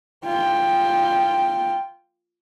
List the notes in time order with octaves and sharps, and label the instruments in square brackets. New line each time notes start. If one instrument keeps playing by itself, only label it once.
[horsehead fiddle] F4 G5